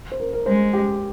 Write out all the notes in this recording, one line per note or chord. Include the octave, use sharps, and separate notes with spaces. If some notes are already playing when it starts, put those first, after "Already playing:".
C5
A#4
A#4
G#3 C5
G4